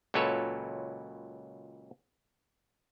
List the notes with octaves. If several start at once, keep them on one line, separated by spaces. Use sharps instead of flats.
C#2 A#2 F#3 A4 B4 C#5